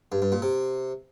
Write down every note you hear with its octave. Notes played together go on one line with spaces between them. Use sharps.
G2
G2
A#2
C3